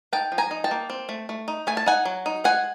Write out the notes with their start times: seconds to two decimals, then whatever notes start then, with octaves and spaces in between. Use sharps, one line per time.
0.12 D#4 G5 A5
0.32 F3
0.38 G#5 A#5
0.51 D#4
0.64 G5 A5
0.71 A#3
0.90 C4
1.09 A3
1.29 A3
1.48 D#4
1.67 A3 G#5
1.77 A5
1.86 D#4 F#5 G#5
2.05 F#3
2.26 D#4
2.44 G#3 F#5 G#5